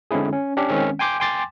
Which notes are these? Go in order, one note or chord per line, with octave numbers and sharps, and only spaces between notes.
D3 G#3 C4 C#4 E4 G#4
C#4
C#4 D4 G4
D#3 G#3 C4 C#4
G5 G#5 C6 D6 G6
G5 G#5 C6 D6 A6